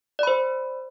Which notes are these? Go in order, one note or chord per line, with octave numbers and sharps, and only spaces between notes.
C5 D5 B5